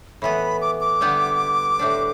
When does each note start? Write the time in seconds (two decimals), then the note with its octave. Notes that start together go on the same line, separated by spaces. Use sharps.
0.22 A2 E3 B3 B5
0.61 D6
0.81 D6
1.01 D3 G3 B3 G4
1.79 A2 G3 D4